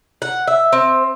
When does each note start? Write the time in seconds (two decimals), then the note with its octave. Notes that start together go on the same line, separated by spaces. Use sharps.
0.22 F#5
0.48 E5
0.73 C4